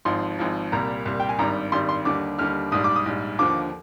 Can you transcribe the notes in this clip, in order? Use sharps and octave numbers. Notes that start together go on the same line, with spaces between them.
G#1 G#2 F3 C6
G#1 G#2 F3
C2 A#2 G3 A#5
C2 A#2 G3
G5
G#5
G#1 G2 D#3 G3 A#5
G#1 G2 D#3 G3 C6
C6
D#2 D3 G3 D6
D#2 D3 G3 F6
A#1 G#2 G3 D#6
D6
D#6
A#1 G#2 G3
D#2 D3 F3 D6